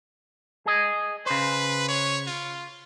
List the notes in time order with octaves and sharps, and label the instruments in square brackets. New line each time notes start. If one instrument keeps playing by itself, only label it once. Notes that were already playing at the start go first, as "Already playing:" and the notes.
[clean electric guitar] G#4 D#5
[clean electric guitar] C#3 C5 [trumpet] B4
[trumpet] C#5
F4